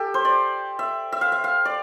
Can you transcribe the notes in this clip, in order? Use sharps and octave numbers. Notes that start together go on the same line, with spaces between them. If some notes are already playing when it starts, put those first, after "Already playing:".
Already playing: G4 A4
C5
D5
E5
E5
F5
E5
F5
D5